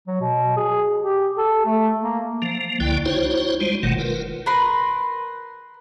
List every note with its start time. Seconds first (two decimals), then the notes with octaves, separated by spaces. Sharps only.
0.07 F#3
0.20 B2
0.56 G#4
0.99 G4
1.37 A4
1.65 A3
2.02 A#3
2.42 F3 A#3
2.80 C#2 D3 E4 D5 G5
3.06 D#4 E4 F#4 C5 C#5
3.60 G3 G#3 F4 C5
3.83 G1 B2 D#3 A3 F#5
3.99 F4 A#4 B4
4.46 A#4 B4 C6